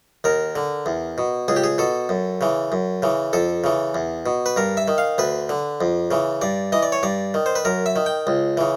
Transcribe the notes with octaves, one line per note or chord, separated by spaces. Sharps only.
D#2 A#4
D3
E2
B2
C#2 G#4
G4
G#4
B2 A4
F#2
C#3 E3
F#2
C#3 E3
F2 A4
C#3 E3
E2
B2
B4
G2 A#4
E5
D#3
F5
D2 B4
D3
F2
C#3 E3
G2 D5
E3 D#5
D5
C#5
G2 D5
D#3
C5
B4
F#2 A#4
E5
D#3
G5
C#2
C#3 E3